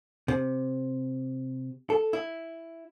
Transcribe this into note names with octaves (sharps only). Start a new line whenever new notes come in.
C3
A4
E4